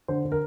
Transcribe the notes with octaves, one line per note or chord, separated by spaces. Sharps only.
D3 C5
D3
A#4